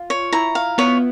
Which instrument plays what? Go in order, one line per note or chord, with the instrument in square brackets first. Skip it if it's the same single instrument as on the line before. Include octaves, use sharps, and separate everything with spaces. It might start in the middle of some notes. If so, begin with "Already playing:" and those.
Already playing: [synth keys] F4
[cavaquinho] C#5
[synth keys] E4 [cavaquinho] A#5
[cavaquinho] F5
[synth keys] B3 [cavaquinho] C#5